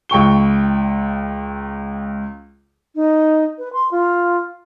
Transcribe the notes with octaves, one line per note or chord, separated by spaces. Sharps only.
C#2 G5 C#6 G7
D#4
B4
C6
F4